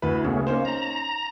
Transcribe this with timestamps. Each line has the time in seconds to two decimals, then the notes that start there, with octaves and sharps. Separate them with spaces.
0.02 D2 E4 B4
0.25 C#3 A3 B3 C#4
0.47 A#3 C#4 D#4 C5
0.65 A#5